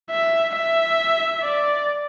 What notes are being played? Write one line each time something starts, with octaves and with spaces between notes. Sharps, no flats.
E5
E5
D5